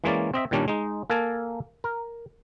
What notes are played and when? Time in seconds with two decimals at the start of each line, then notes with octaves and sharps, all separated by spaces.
0.04 E3 G#3 A#3 C#4 D5
0.34 C4 D#5 E5
0.51 A#2 D#3 G3 C#4 D4
0.68 G#3 D#4
1.10 A#3 A4 A#4 G#5 A5
1.84 A#4